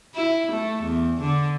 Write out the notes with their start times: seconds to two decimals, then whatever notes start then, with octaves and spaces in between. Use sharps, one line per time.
0.15 E4
0.51 A3
0.83 E2
1.21 D3